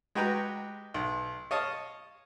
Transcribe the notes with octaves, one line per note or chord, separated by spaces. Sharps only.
G#3 F#4 G4 B4 G5 A#5
B1
C#5 D#5 F5 A5